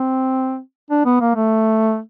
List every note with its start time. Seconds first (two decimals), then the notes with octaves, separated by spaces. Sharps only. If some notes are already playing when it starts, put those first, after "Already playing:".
Already playing: C4
0.90 D4
1.06 B3
1.21 A#3
1.35 A3